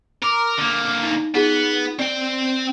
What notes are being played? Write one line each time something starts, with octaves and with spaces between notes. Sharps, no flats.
A#4 A#5 D6
D3 A#3
D#4
B3 D#4 F4 G#4
C4 D5 G5